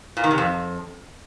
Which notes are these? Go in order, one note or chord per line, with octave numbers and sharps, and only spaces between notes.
A#2
D#3
C3
F2